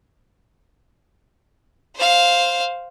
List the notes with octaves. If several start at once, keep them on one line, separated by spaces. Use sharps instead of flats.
C5 F5